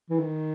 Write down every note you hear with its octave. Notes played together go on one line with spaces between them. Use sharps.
E3
D#3